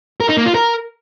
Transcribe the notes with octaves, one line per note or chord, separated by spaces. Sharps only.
A#4
D#4
A#3
F4
A#4